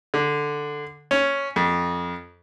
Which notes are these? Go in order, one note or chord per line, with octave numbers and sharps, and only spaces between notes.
D3
C#4
F2